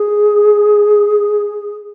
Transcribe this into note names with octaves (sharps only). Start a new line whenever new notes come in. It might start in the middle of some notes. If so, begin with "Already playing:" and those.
Already playing: G#4